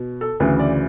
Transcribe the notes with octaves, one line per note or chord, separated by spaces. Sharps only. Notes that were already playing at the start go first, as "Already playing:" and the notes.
Already playing: B2
A4
D2 C#3 E3 B4
D5